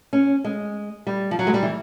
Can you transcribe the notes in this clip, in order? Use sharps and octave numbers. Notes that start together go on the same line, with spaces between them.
C#4
G#3
G3
F3
F#3
G#3
G3
E3